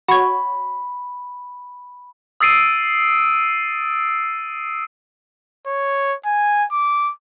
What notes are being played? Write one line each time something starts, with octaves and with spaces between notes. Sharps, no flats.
F#4 C#5 B5
D#6 E6 A6 C7 D7 D#7
C#5
G#5
D6